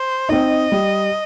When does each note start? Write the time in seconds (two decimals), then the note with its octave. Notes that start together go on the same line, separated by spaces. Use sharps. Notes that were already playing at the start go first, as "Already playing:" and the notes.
Already playing: C5
0.29 C4 D#4 D#5
0.72 G3